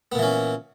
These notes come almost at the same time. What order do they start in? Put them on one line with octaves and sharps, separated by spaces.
B3 A#2 E3 C#4